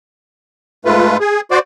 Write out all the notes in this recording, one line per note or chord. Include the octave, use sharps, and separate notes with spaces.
G#2 A3 F4 B4
G#4
F#4 C5 D5